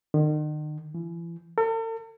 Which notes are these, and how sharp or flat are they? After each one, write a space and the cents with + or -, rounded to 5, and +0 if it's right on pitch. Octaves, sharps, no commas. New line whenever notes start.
D#3 -40
E3 +35
A4 +45